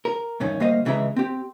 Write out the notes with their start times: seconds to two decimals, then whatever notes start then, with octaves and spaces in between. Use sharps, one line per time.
0.05 A#4
0.40 E2 G2 D#3 C#4
0.60 D2 G3 A#3 C5 D#5 F5
0.85 C#2 C#3 E3 G#3 E5 A#5
1.16 C4 G4